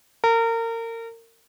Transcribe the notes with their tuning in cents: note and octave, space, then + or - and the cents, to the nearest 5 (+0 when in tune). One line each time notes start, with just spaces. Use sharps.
A#4 -30